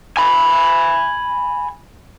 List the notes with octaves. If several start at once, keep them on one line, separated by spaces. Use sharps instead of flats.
G#5 B5